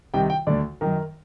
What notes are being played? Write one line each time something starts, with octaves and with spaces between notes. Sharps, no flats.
C2 C3 D#3 G5
G5
D2 D3 D5
F#2 D#3 A#4